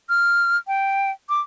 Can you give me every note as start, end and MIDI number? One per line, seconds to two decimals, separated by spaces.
0.09 0.57 89
0.67 1.11 79
1.29 1.41 86